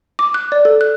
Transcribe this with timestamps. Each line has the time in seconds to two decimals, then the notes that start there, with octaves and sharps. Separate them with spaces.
0.19 D6
0.34 F#6
0.52 D5
0.65 A4
0.81 F#6